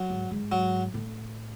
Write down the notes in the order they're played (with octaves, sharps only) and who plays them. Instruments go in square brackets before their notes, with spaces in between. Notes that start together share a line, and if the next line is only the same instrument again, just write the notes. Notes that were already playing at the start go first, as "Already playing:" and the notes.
Already playing: [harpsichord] F#3
[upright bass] G#2
G#2
[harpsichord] F#3
[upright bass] A2